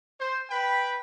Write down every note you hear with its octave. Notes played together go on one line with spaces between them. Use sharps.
C5
B4 G5 B5